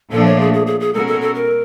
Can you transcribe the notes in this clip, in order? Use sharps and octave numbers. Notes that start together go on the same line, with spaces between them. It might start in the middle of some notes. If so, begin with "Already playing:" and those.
A#2 F3 A3 D4 A4
C#5
G#4
G#4
G#4
G#4
B2 G#3 C#4 F#4 A4 A#4
A4
A4
A#4